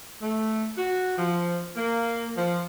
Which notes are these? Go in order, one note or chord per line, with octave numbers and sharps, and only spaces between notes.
A3
F#4
F3
A#3
F3